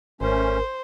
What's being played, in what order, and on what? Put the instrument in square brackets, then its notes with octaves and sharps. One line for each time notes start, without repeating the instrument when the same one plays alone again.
[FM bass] G#1 [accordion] A3 C#4 [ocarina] A#4 [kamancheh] C5